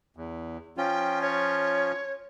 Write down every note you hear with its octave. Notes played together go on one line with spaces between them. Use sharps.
E2
F3 C#4 F4 G5
C#5